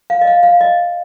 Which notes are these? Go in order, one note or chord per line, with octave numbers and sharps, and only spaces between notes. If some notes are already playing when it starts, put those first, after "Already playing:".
F5
D#5
F5
F5
D#5